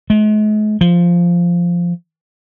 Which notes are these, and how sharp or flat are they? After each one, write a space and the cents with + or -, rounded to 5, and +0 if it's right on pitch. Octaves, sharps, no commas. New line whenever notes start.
G#3 +45
F3 -5